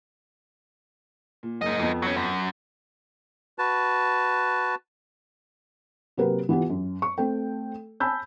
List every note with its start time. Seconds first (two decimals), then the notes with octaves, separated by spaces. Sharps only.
1.43 A#2
1.61 F#1 G#2 D#5
1.80 F2 B3
2.02 F#3 C#4
2.17 F#2
3.59 F#4 B4 A5
6.17 C3 F#3 A#3 G4 A#4 B4
6.49 E3 B3 F4 G4
6.70 F#2
7.02 C#6
7.18 A3 C4 A4 G5
8.00 G#5 A5 B5 E6 G6